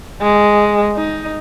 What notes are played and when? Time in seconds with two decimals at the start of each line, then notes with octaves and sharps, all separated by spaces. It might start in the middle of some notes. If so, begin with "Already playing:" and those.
0.21 G#3
0.95 D#4